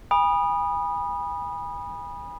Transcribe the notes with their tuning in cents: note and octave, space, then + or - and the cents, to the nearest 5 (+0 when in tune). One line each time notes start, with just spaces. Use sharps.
G#5 -35 B5 -20 D#6 -20